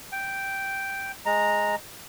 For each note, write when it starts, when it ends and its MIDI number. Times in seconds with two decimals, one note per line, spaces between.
0.12 1.12 79
1.26 1.75 56
1.26 1.75 82